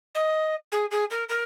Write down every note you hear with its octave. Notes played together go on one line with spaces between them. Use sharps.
D#5
G#4
G#4
A#4
A#4